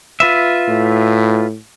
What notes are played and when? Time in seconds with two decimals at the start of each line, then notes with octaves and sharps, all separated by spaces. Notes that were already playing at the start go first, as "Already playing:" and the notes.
0.20 F4 B4 E5
0.68 A2